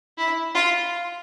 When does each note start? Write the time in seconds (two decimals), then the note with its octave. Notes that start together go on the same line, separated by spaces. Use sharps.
0.18 E4
0.55 F4